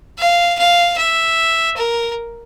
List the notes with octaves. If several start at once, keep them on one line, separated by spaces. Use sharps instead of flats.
F5
F5
E5
A#4